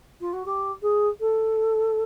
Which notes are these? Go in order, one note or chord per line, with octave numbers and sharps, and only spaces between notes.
F4
F#4
G4
G#4
A4